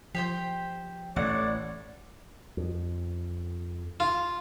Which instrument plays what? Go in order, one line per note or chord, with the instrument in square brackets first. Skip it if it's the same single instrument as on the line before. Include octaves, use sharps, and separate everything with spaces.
[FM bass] F3 [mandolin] G4 C5 G5
[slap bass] A1 [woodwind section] A2 C#5 D5 [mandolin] F#5
[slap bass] F2
[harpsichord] F4